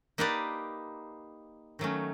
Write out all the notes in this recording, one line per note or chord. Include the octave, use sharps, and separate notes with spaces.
A#3 D#4 G4 B4 D5
D#3 F#3 A3 C#4